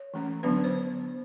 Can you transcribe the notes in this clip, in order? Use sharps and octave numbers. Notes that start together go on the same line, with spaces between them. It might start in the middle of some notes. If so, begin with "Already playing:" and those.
Already playing: C#5
E3 A3 C#4
D3 F#3 B3 D4 B4
C5